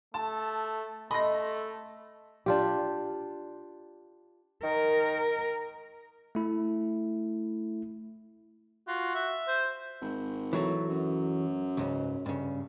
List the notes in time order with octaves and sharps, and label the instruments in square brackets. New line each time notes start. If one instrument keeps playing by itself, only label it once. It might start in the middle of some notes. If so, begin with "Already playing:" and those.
[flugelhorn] A3 [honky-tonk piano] A5
[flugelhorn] A3 [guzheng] D#5 [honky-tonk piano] B5 C6 A#6
[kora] D4 F4 G4
[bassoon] D#3 [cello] A#4
[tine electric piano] A3 E4
[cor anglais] F4 [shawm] F#4
[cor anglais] E5
[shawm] C5
[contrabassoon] G#1
[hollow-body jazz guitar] E3 F#3 A3
[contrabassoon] F#2
[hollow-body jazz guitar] C#2 G#2 C#3
G2 C#3